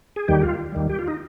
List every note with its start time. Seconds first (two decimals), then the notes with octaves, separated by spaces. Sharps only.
0.16 G#4
0.28 D#2 D#3 G3 G4
0.42 F4
0.72 D#2 D#3 G3
0.89 G4
0.99 F4
1.08 D#4